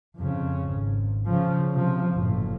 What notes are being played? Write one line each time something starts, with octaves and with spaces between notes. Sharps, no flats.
F2 C#3
G#1
C#3 F3
C3 F3
F#1 A2